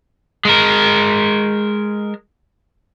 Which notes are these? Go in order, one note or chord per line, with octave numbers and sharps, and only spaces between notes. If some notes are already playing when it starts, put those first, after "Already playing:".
G#3 A#4